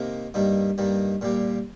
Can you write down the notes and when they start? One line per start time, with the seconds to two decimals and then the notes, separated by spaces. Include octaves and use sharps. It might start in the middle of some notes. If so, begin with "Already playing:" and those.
Already playing: C3 D#3 A#3
0.34 G2 D#3 G3 A#3 D#4
0.78 G2 D#3 G3 A#3 D#4
1.21 A#2 G3 A#3 G4